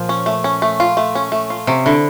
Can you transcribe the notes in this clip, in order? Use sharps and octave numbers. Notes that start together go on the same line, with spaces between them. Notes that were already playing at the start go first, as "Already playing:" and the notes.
Already playing: A#2 F3
C#4
A3
C#4
A3
F4
A3
C#4
A3
F4
C3 C#4
D3 E4